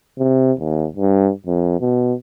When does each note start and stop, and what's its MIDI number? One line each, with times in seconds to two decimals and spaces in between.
0.18 0.52 48
0.59 0.87 39
0.96 1.30 43
1.46 1.79 41
1.80 2.14 47